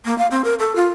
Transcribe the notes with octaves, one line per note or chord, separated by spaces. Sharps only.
A#3
F5
C4
A#4
A4
F4